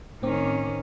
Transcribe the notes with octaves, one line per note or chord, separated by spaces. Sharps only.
A2 D#3 C4 C#4 D6